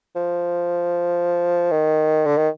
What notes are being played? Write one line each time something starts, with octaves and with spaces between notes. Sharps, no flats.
F3
D#3
D3
D#3